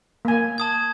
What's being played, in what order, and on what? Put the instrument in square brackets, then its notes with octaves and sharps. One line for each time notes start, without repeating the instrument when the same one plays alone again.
[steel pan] A#3 G#5
[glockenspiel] A5 D#6 G#6